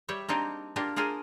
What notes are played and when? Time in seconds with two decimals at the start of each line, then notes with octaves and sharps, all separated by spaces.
0.09 G3 G4 C#5 E5
0.29 A#3 C4 D4 D#4 G4 A#4
0.76 A#3 D4 F4 G4 A#4
0.96 D4 F4 G#4 A#4 C5 G#5